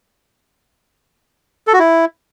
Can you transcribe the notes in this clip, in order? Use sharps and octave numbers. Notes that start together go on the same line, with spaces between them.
A4
F#4
E4